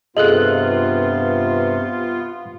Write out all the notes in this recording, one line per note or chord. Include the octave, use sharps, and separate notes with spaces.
G2 C3 B3 F4 G#4 A4 D#5 F#6